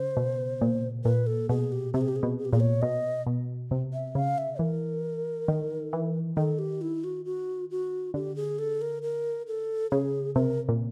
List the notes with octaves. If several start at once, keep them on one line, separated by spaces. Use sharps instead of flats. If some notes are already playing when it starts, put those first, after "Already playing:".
Already playing: C#3 C5
B2
A#2
A#2 B4
A4
B2 G#4
G4
C3 G4
G#4
G4
G#4
B2
G#4
G4
A#2 G#4
C#5
B2 D#5
B2
C3
E5
C#3 F5
E5
E3 A#4
D#3
E3
D#3 A4
G4
E4
F#4
F#4
F#4
D3 G4
G#4
A4
A#4
A#4
A4
C#3 G#4
C3 A#4
A#2